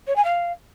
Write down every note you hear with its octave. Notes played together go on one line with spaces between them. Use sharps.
C#5
G#5
F5